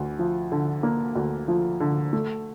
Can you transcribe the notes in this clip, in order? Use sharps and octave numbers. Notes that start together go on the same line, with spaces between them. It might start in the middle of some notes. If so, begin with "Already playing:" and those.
Already playing: D2
F3
D3
A#3
D2
F3
D3
A3